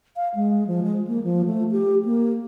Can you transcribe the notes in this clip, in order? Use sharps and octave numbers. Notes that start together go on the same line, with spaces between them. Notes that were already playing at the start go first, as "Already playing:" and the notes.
F5
G#3
F3
G#3
A#3
F3
A3
G4
A#3